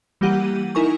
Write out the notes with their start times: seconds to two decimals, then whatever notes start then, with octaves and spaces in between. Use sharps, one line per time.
0.21 E3 G3 A#3 G4 F#5 D#7
0.75 D#4 E4 A#4 G#5 C#6